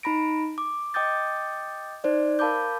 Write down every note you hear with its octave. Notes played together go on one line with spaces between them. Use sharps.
D#4 A#5 B5 A#6 D7
D6
D#5 G5 D6 D#6 G6 A6
D#4 C5 D5
A#4 F5 A5 B5 D6 G6